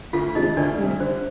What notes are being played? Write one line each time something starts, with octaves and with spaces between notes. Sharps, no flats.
D2 F4 F5
C3 D#3 G#3 D4 D#4 D#5
D2 D4 D5
C3 D#3 G3
D3 C5